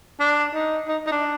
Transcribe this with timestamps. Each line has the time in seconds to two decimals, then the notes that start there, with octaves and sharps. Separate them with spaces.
0.20 D4
0.55 D#4
0.88 D#4
1.07 D#4
1.12 D4